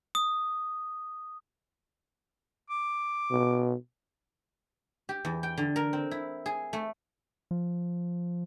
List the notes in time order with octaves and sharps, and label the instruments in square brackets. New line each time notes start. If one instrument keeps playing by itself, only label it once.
[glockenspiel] D#6
[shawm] D6
[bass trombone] B2
[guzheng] G4
E2
G5
D3
A#4
C4
E4
G#4
A3
[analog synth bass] F3